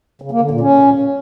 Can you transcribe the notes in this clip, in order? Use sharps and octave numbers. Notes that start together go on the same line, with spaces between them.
C#3
A#3
D3
A#2
C#4